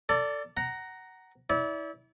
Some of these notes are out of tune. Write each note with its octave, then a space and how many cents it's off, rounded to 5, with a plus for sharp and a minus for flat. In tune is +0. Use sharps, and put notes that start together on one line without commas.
A4 +25 D5 -10
F#5 +20 A#5 +0
E4 -30 D5 -35